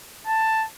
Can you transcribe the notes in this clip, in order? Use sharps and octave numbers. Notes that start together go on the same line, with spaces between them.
A5